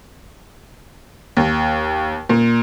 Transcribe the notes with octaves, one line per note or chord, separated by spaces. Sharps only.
D#2
A#2